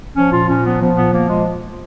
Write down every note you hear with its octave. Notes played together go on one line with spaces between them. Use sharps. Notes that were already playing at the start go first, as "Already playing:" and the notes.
F3 C#4
A#2 F4
A#2 C#4
F3 B3
F3 B3
A#2 B3
F3 A#3
A#2 G#3